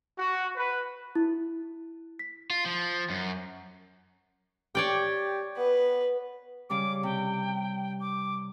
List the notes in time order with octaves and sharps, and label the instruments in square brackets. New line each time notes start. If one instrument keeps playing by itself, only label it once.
[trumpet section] F#4
B4
[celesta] E4
B6
[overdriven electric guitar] F4
F3
F#2
[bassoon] G4 [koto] C#5 D5 G5
[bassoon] B3 [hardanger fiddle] B4
[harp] C#3 G3 [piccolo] D6
[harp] C3 [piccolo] G5
[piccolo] D6